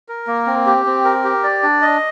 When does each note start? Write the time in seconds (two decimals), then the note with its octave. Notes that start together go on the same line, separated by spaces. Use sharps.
0.08 A#4
0.27 A#3
0.47 C4
0.66 G4
0.86 C4
1.05 A#4
1.24 G4
1.44 D5
1.63 D4
1.82 D#5